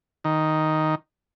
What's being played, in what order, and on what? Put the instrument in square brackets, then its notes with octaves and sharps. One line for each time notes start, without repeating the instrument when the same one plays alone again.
[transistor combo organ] D#3